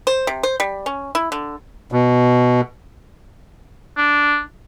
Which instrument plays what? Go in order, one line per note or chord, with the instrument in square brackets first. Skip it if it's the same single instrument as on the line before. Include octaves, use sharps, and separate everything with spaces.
[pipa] C5
C3
C5
G3
C#4
E4
D3
[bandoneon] B2
[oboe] D4